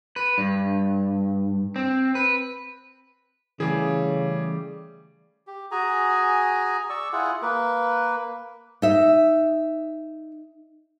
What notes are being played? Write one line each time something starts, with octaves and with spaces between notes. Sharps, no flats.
B4
G2
C4
B4
C#3 E3 G3 A3 G#4
G4
F#4 G#4 G#5 A#5
D5 C#6 E6
E4 F4 G#4 F#5
A#3 B4
D#4 E5